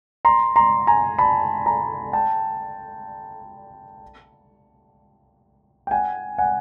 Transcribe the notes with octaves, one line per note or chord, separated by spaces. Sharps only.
A#5 C6
A#5 C6
G#5 A#5
A5 B5
G#5 A#5
G5 A5
G5
F#5 G#5
F#5 G#5